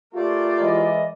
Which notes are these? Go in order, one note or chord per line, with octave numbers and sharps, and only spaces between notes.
A3 F4 G4 A#4 D5
E3 G#3 E4 D#5